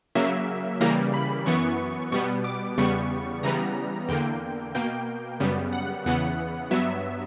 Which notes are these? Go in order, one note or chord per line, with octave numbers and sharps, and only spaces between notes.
C#3 F#3 A#3 E5
C#3 E3 G3 A#3 A#5
B5
F#2 E3 B3 C#6
B2 G3 B3 C#6
D6
E2 C#3 G3 B3 C#6
C#3 E3 G3 B3 A#5
E2 D3 A#3 G5
B2 A#3 G5
F#2 C#3 G3 B3
F#5
E2 C#3 E3 B3 F#5
G2 F#3 B3 E5